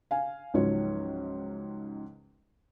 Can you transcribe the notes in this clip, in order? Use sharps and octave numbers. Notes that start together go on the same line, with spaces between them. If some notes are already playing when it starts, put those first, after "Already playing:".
F5 G#5
C#2 G#2 F3 F#3 C#5